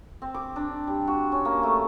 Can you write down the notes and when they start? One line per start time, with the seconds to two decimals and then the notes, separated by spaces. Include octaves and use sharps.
0.22 C4
0.34 D6
0.56 D4
0.87 G3
1.07 F#4
1.32 C#4
1.45 A#3
1.63 A3